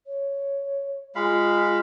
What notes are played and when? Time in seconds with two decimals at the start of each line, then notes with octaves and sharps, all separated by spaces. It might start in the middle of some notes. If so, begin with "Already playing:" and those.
0.06 C#5
1.15 G#3 F4 F5 B5